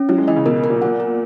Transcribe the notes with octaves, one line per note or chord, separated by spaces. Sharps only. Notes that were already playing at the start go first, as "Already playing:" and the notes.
Already playing: C#4
F#3 E4
G#3
E3 D#5
C#3
B2 A#4
A#4
A#2
A#2 F#5
A#4